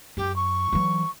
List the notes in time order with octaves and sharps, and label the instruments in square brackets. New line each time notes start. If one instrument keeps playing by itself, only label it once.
[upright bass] F#2 [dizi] G4
[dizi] C#6
[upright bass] E3 F#3